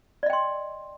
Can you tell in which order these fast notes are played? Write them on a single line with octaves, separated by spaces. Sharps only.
D5 D#5 G5 C6